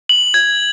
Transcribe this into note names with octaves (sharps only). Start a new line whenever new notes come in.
F#7
G#6